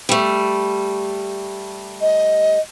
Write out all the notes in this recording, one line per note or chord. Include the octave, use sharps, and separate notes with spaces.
G3 A3
D#5